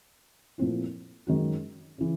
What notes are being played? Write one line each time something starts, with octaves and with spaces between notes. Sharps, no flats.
A#2 F3 A3 C4 E4
F#2 D#3 G#3 C#4 F#4
C#3 E3